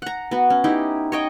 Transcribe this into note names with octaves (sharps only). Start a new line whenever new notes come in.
F#5 A#5
B3 F#4
C#4
D#4 E4 G4
C#5 D#5 G5